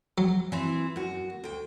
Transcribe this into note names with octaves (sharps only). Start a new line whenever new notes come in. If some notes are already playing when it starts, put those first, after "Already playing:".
F#3
E3 C4 E4
F#2 F#4
D2 G5